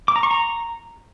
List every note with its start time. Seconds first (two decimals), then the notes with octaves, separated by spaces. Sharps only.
0.08 D6
0.16 A#5
0.23 C#6
0.31 A#5